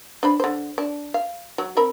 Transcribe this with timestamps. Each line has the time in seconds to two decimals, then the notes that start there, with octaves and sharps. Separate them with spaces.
0.23 D4 C5 B5
0.40 D3 C5
0.78 D4
1.14 F5
1.58 F#3
1.77 C4 A#4 B5